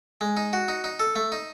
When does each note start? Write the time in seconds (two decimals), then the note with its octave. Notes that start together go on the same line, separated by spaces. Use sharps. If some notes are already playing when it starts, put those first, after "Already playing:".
0.21 G#3
0.37 D#4
0.53 F#4
0.68 D#4
0.84 D#4
0.99 A4
1.16 A3
1.32 D#4